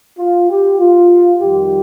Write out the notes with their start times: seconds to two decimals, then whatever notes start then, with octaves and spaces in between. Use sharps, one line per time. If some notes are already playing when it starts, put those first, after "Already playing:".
0.18 F4
0.49 G4
0.79 F4
1.40 F2 D#3 G3 G4